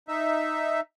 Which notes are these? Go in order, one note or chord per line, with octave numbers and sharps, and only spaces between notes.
D#4 E5